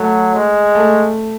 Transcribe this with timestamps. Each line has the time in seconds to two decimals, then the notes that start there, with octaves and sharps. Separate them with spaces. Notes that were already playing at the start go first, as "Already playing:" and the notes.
Already playing: F#3 A3
0.34 G#3
0.75 A3